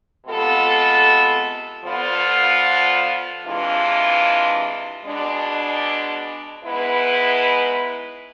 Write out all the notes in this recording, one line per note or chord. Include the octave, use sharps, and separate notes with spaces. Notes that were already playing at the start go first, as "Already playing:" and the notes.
C3 G#3 B3 F4 A4
D3 F3 B3 F4
C3 E3 G#3 D4 F4
B2 G#3 D4
G#2 G#3 B3 E4 B4